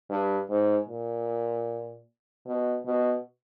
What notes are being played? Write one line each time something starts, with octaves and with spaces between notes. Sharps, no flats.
G2
G#2
A#2
B2
B2